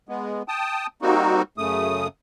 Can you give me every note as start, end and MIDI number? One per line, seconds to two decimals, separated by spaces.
0.09 0.43 56
0.09 0.43 59
0.48 0.87 79
0.48 0.87 81
0.48 0.87 87
1.02 1.42 55
1.02 1.42 58
1.02 1.42 60
1.02 1.42 63
1.02 1.42 66
1.58 2.08 42
1.58 2.08 49
1.58 2.08 57
1.58 2.08 87